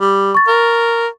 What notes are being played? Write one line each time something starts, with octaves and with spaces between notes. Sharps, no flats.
G3
C#6 A6
A#4